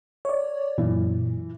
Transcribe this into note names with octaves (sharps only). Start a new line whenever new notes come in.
C#5 D5
F#2 A#2 E3